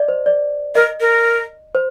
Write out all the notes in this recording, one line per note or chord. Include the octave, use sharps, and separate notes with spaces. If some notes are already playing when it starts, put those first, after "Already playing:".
Already playing: D5 D#5
C5
D5
A#4 D#5
A#4
C5